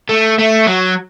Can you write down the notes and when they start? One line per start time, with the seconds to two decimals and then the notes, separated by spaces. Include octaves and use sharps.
0.09 A3
0.39 A3
0.67 F#3